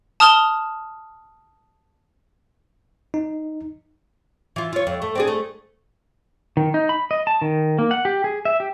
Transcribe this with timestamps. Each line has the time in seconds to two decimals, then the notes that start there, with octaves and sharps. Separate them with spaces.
0.20 A5 D#6 F6 F7 G7
3.14 D#4
4.56 E3 F4
4.73 F4 C#5
4.87 F2
5.02 A3
5.15 C4 D4 G#4
5.28 A3
6.57 D#3
6.74 D#4
6.89 B5
7.11 D#5
7.27 A5
7.42 D#3
7.79 A#3
7.91 F#5
8.05 G4
8.24 G#4
8.45 E5
8.60 G4